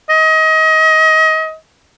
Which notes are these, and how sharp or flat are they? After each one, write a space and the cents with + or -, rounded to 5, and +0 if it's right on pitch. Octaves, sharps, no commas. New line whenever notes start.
D#5 +30